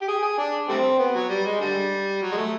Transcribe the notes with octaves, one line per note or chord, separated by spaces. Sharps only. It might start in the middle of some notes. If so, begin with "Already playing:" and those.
G4
G#4
G#4
D4
G3 A3 C4
B3
F#3
G3
G#3
D3 G3
F#3
G#3
A3